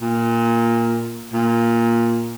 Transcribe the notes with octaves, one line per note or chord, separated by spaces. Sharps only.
A#2
A#2